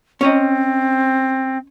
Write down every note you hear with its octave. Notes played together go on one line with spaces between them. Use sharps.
C4 C#4 C#5 D#5